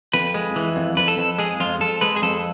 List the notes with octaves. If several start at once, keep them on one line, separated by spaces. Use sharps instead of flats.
F2 B4
G#3
E3
F2
F2 B4
A4
F2
G#3 G#4
F2 F4
F2 A4
G#3 B4
G#4
F2 A4